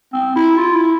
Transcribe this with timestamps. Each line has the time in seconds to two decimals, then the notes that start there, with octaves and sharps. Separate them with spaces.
0.13 C4
0.36 E4
0.58 F4
0.75 E4